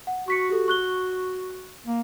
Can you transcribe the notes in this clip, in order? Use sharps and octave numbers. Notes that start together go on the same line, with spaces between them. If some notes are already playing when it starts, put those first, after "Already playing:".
F#5
F#4 C#6 B6 C#7
G4 A4
C#6 F#6 G7
A#3